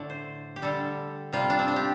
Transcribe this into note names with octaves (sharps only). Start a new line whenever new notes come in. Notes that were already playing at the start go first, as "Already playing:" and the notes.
Already playing: A2 D3 A3 D5
C5
G4
D3 G3 A4
C3 G3 F4
D4
C4
D4
G4